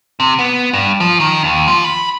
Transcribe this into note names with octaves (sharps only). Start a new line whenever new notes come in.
C3
B3
G2
F3
D#3
D#2
F3
B5